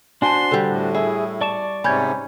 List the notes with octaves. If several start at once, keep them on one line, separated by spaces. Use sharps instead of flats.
D4 F#4 C5 G#5 A5 C6
D3 G3
A2
E4 G#4
D5 A5 C#6 E7
G#2 C3 C#4 B5 G6 G#6